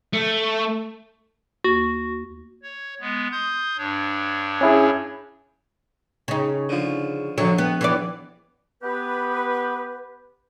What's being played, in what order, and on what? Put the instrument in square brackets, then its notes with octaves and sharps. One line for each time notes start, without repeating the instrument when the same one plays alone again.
[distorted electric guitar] A3
[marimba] D#2 A#3 A6 [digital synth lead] F#4
[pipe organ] C#5
G#3 B3
C6 D#6 G6
G2 D4 C#5
[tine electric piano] C#4 E4 G#4
[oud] C#3 D#4
[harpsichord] D3 F3
[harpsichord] A#1 C#6 [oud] D3 F#3
[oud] B3
E3 B3 D5
[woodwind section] B3 G4 B4